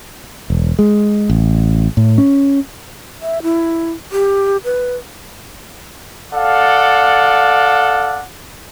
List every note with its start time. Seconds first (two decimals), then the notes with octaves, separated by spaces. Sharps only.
0.50 E1
0.79 G#3
1.29 A1
1.97 A2
2.18 C#4
3.21 E5
3.43 E4
4.12 G4
4.64 B4
6.34 A4 D5 F5 F#5